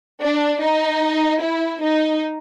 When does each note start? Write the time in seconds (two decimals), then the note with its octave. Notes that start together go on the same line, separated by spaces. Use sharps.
0.21 D4
0.61 D#4
1.41 E4
1.82 D#4